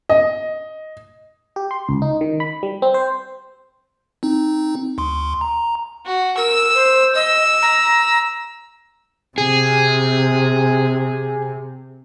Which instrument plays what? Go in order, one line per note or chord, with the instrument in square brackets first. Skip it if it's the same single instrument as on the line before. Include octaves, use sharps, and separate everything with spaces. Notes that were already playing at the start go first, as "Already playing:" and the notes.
[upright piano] D#5
[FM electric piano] G4
C6
C#2
D#4
D#3
B5
G3
C4
C5
[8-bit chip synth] C4 D#4
D2 C6
A#5
[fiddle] F#4
[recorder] A#4 [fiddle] E6
[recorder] C5
[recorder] D#5 [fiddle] E6
[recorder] A#5
[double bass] C3 [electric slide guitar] G#4